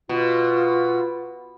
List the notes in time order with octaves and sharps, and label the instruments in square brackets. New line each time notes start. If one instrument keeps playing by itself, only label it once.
[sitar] B2 [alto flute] F4